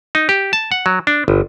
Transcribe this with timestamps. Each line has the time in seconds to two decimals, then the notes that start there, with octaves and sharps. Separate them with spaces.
0.15 D#4
0.29 G4
0.53 A5
0.72 F#5
0.86 F#3
1.07 D4
1.28 G1